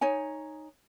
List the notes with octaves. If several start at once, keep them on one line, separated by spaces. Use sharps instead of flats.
D#4 C#5 G#5